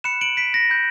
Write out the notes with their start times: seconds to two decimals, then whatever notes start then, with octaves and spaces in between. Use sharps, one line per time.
0.04 B5 F#6 C#7 E7
0.21 D7 F#7
0.37 B6 D7
0.54 A#6
0.70 B5 F#6 G6